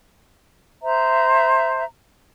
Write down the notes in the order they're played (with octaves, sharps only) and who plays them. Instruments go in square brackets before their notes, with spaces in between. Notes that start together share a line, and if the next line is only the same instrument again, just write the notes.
[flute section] C5 E5 A#5